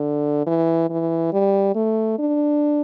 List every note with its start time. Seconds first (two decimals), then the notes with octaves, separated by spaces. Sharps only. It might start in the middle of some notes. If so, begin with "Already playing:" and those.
Already playing: D3
0.47 E3
0.90 E3
1.33 G3
1.75 A3
2.19 D4